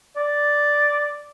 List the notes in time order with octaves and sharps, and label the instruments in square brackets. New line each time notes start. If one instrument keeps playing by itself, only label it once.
[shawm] D5